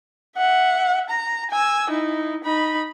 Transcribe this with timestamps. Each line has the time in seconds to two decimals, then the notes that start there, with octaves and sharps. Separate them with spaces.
0.37 E5 F#5
1.10 A#5
1.51 G#5 E6
1.90 D#4 E4
2.44 D#4 B5